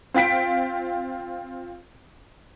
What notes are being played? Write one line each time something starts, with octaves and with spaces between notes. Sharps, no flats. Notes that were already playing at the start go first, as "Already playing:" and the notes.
C4 F4 G5 B6 D7